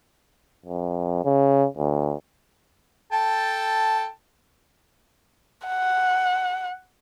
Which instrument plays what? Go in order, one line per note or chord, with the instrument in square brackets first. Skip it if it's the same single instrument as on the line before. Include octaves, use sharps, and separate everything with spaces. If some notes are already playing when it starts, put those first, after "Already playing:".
[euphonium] F2
C#3
D2
[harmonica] A4 G5 A5
[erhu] F#5